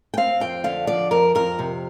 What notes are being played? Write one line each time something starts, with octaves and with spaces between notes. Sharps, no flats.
G5
C4 F5
F2 G5
D3 F5
F3 D5
F2 A#4
F2 A#4
C3